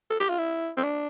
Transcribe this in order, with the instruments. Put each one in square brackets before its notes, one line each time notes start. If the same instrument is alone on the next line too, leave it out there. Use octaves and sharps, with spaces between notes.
[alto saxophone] A4
G4
F4
E4
C4
D4